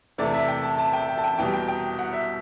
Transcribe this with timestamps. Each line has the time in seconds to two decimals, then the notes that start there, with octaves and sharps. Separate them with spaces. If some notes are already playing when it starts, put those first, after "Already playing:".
0.18 E2 C3 E3 A3 D5
0.34 E5
0.48 G5
0.63 A5
0.78 A5
0.93 G5
1.09 G5
1.18 A5
1.24 G5
1.38 E2 B2 G3 G5
1.53 G5
1.68 G5
1.99 F#5
2.13 E5